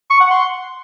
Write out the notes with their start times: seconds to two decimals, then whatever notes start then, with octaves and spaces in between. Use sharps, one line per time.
0.10 C#6
0.21 F#5
0.31 C6